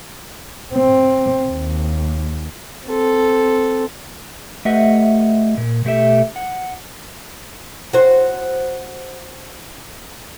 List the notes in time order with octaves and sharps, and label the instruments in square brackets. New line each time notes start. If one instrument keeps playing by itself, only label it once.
[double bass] C4
D#2
[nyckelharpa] C4 A4
[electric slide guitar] A3 G4 B4 D#5 E5 F#5
A#2
B2 A3 G4 E5
F#5
[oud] F#4 C5